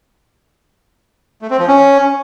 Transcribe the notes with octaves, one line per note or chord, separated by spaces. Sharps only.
A3
C4
F3
C#4